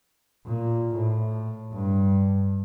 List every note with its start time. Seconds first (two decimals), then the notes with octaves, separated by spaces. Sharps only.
0.46 A#2
0.95 A2
1.73 G2